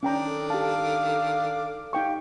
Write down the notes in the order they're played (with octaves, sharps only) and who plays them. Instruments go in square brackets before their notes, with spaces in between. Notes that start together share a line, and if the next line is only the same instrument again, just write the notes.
[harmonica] D#3 D4 D6 [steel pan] C#4 G5 A#5
[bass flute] A4
[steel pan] G4 A5 [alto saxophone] F5
[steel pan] D#4 G5 C#6 [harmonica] G4 [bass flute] F5